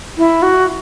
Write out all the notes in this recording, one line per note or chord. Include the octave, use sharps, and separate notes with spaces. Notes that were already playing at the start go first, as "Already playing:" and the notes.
E4
F#4